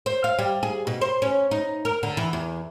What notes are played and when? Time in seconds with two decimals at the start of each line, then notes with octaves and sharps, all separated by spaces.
0.06 C5
0.24 F5
0.39 G3
0.63 G#4
0.87 B2
1.01 C5
1.22 C#4
1.51 D#4
1.85 A#4
2.03 D3
2.17 E3
2.33 E2